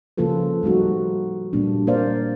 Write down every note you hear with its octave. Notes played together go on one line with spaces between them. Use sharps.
C#3 F3 A#3 F4 A4 B4
G3 A3 D#4 F#4
A#2 G3 A#3 D4
A#3 A#4 C5 D5 F5